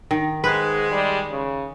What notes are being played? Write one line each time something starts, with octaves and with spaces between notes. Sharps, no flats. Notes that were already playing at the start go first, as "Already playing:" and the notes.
D#3
G#2 G#3 B4
G3
C#3